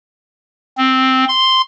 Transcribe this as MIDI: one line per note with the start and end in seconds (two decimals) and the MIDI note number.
0.77 1.25 60
1.28 1.62 84